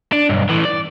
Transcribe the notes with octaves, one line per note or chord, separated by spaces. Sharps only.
D4
B1 G2
A2 E3
D5